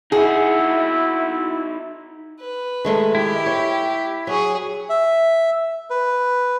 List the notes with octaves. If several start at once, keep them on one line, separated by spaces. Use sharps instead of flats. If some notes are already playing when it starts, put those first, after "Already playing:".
D#4 E4 F#4 G#4
B4
D#3 G#3 A3
E4 G4
C#5
F#3 G#4 C#5
E5
B4